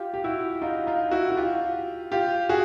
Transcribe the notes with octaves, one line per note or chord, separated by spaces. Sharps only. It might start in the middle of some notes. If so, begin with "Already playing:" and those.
Already playing: F4 G4
G4
E4 F#4
D#4 F4
D#4 F4
E4 F#4
F#4
F4 G4
F4 G4
F#4 G#4